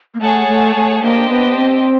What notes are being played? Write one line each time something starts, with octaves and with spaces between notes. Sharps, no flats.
A#3
A3 G#4 C#5 F#5 A5
A3
A3
A#3 D4 G4 C5 D#5 G5
B3
C4